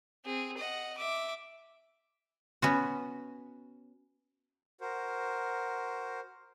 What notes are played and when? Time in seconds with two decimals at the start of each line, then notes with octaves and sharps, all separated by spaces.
0.25 C4 G#4
0.58 D#5 F#5
0.97 E5 D6
2.62 B3 C#4 F#4
4.81 F#4 A#4 C5